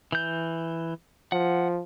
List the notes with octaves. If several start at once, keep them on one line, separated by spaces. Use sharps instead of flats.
E3 G6
F3 F#5